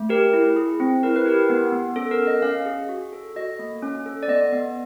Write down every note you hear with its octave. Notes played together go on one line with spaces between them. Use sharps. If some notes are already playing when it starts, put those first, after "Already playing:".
Already playing: A3
G4 A#4
E4
G#4
C4
E4 A#4
B4
G4 A#4
B3
B3
C#4 A4
A#4
C#4
D#5
C#4 F5
G#4
F#4
A4
F#4 D#5
A#3
C#4
A4
D5
B3 D#5
B3